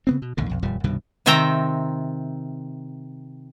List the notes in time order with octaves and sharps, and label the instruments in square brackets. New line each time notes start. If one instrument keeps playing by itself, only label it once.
[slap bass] C#3 B3 C4
B2
A#1 D#2 G#2 D3
B1 F2
D#1 F2 A#2 G3
C2 G2 B2 D#3
[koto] C3 D#3 C4 E5 G5 A#5